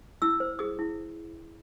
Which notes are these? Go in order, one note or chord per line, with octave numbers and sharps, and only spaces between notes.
E4 E6
C5
G#4 D#6
E4